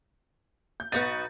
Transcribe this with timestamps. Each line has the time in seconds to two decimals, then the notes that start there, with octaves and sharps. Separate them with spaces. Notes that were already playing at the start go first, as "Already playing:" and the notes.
0.80 G6
0.92 B1 B3 D#4 F#4 B4 A6